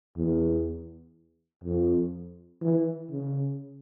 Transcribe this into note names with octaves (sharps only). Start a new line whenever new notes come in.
E2
F2
E3
C#3